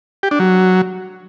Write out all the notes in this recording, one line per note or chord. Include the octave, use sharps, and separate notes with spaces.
G4
D4
F#3